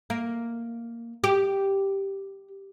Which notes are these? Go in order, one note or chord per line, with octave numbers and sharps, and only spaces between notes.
A#3
G4